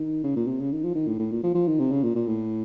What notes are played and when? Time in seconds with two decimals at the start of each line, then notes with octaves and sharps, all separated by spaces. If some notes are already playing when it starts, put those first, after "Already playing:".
Already playing: D#3
0.24 C#3
0.36 A#2
0.47 C3
0.60 C#3
0.72 D#3
0.84 F3
0.95 D#3
1.08 A2
1.19 A2
1.31 A#2
1.43 F3
1.55 F3
1.68 D#3
1.80 C3
1.91 C#3
2.03 A#2
2.15 A#2
2.27 A2